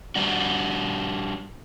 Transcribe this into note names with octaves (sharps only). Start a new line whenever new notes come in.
G3 D4 F#4